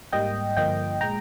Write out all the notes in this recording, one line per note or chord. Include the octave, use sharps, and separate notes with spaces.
G#2 G3 A#3 D#5 G5
G2 D3 F3 A#3 D#5 G5
A#2 G#3 G5 A#5